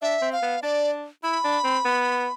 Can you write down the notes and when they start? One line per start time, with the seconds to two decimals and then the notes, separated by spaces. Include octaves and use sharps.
0.02 D4 E5
0.22 C4
0.33 F5
0.42 B3
0.62 D4 D5
1.23 E4 B5
1.44 D4
1.64 C4
1.85 B3